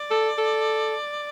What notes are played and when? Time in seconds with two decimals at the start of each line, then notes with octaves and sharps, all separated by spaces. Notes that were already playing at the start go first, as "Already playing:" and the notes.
Already playing: D5
0.10 A4
0.38 A4